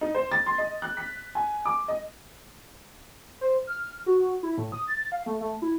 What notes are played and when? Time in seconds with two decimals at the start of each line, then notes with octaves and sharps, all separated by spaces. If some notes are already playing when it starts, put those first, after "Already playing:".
0.01 D#4
0.15 C5
0.32 A6
0.46 C6
0.58 D#5
0.82 F#6
0.97 B6
1.35 G#5
1.65 D6
1.88 D#5
3.41 C5
3.67 F6
4.06 F#4
4.43 E4
4.58 A2
4.72 D#6
4.87 A6
5.12 F5
5.26 A3
5.41 A3
5.62 E4